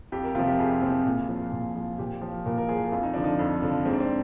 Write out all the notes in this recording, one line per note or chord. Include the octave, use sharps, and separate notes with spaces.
F2 G4
A#4
C3 F3 F4
G4
F2 G#4
C3 F3
A#2
F3
A#2
F3
A#2 G4
F3
A#2 A#4
A#4
F3 G#4
F2 F4
D#4
D3 F3 D4
D#4
F2
D3 F3
G#2 C4
D4
C4